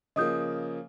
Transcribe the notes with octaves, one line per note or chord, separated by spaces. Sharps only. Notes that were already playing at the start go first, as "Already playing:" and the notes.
C#3 F3 A#3 D#5 D#6 G6